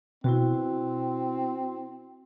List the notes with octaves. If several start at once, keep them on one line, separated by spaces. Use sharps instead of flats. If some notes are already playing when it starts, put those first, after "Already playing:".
B2 C4 E4 F#4